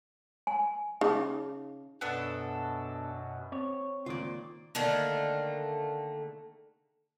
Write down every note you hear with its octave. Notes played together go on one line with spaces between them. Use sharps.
G#5
C#3 D#4 D6
F#2 B2 B3 D4 A4
C4 C#5
C#2 D#3 A#3 F4 D5
D3 D#3 A3 A#3